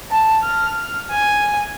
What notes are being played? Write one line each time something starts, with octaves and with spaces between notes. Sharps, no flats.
A5
F6
G#5